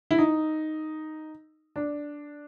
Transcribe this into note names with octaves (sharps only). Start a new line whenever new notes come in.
E4
D#4
D4